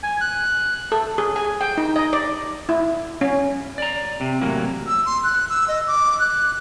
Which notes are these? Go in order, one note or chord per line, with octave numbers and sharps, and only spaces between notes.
G#5
F#6
A4
G#4
G#5
G5
D#4
D#5
D5
E4
C#4
D5 A#5
C3
A2 C3 E3 F#3 A#3
E6
C6
F#6
E6
D#5
D6
F#6